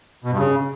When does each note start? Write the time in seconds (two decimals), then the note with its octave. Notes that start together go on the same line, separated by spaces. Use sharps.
0.24 B2
0.31 G2
0.38 C#3